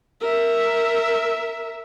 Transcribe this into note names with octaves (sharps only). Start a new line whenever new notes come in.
A#4 E5